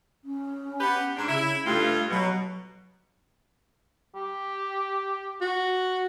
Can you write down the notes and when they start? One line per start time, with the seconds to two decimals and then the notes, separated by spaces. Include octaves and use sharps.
0.25 C#4
0.80 B3 G4 B4
1.16 G#2 D4
1.28 C#3 E4
1.66 G2 A3 F4
2.11 B2 F#3
4.15 G4
5.41 F#4